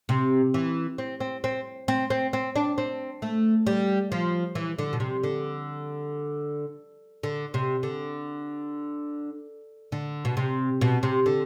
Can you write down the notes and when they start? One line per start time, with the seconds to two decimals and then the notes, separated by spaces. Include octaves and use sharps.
0.09 C3
0.54 E3
0.98 C4
1.20 C4
1.44 C4
1.88 C4
2.10 C4
2.33 C4
2.56 D4
2.78 C4
3.22 A3
3.67 G3
4.12 F3
4.55 E3
4.79 D3
4.93 B2
5.00 C3
5.24 D3
7.23 D3
7.54 C3
7.83 D3
9.92 D3
10.25 B2
10.37 C3
10.81 B2
11.03 C3
11.26 D3